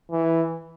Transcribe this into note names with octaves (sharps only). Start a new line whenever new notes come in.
E3